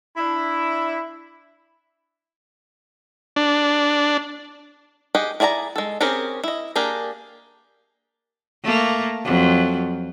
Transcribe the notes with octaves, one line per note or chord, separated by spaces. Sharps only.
D4 E4
D4
G4 G#4 D#5 F#5
E4 G#4 D5 G#5 A#5
G#3 A4
C4 C#4 G4 G#4 A#4
E4 D#5
A#3 D4 G4 G#4 A#4
A3 A#3
F2 F#3